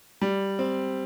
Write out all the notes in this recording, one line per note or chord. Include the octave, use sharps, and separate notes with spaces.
G3
C4